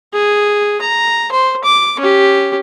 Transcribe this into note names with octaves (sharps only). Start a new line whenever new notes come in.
G#4
A#5
C5
D6
C#4 G4